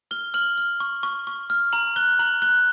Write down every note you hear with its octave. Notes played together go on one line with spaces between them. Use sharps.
F6 G7
F6 F#7
F6
C#6
C#6
C#6
F6
A#5 F#7
F#6 G7
A#5 F#7
F#6 G7